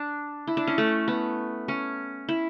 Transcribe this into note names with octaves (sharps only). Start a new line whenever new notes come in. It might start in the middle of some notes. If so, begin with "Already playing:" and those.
Already playing: D4
E4
D4
C#4
A3
B3
C#4
E4